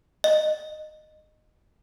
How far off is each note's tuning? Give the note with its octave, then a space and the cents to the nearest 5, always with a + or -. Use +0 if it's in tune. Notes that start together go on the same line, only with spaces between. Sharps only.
D#5 -15